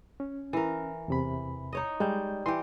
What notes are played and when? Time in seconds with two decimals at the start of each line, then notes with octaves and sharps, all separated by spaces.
0.20 C#4
0.53 E3 A#4
1.08 E2 C3 B5
1.73 D#4 C#5 D#5
2.00 G3 G#3 G6
2.46 E3 G4 C6